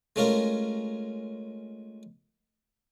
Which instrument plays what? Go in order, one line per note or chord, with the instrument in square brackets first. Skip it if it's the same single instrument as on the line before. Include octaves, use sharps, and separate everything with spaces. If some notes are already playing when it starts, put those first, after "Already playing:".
[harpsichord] G#3 A3 C#4 F4 A#4